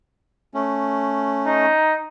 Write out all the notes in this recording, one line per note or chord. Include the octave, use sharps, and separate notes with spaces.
A3 C#4
D#4